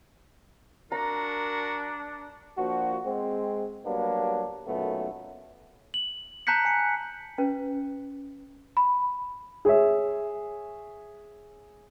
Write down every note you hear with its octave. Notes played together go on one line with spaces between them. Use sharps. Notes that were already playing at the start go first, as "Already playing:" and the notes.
D4 F#4 A#4 A#5
F3 A#3 D4 F#4
G#3 C4
F#3 G3 A#3 B3 D4
B1 F#2 A#2 A3 B3
F#7
A5 A#5 F#6 G6 B6 C#7
G#5 C#7
C#4 B4
B5
G#4 C#5 E5